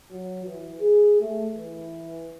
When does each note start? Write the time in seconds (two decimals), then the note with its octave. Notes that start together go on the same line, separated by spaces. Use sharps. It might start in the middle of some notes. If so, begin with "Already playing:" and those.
0.11 F#3
0.45 E3
0.81 G#4
1.21 A3
1.53 E3